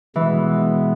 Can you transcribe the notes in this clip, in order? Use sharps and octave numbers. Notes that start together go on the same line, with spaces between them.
B2 E3 G#3 B3